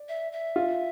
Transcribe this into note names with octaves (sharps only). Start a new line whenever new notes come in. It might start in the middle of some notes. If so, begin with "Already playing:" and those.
Already playing: D5
E5
E5
F4